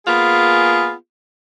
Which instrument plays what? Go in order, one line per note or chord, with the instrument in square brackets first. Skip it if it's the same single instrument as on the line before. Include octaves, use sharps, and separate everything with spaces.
[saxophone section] A#3 B3 F4 G#4